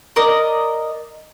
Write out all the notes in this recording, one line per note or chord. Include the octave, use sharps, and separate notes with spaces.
A#4 D5 D#5